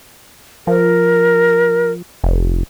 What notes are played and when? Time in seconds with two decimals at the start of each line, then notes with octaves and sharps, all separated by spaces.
0.67 F3 A#4
2.24 F1